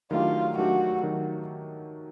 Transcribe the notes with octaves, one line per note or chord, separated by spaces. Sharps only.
D#3 F#3 A3 D4 F4 G4
D#3 F#3 A3 D4 F#4 G4
D#3 F#3